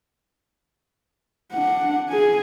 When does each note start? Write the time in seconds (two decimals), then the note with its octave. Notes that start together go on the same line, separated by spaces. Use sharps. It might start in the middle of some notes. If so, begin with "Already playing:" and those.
1.53 D4 F#5
2.09 G#4 G#5